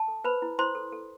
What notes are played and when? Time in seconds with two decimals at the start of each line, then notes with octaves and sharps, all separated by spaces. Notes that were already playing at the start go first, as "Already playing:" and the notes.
Already playing: A5
0.08 A4
0.24 B4 C5 B5
0.42 E4
0.59 E4 C5 C6
0.75 A4
0.92 A4